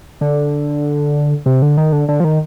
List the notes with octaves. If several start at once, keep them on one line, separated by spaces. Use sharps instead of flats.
D3
C3
D3
D#3
D3
D3
F3
D#3